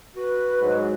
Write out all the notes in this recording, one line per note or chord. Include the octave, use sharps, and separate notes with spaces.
F#4 B4
G#2 F#3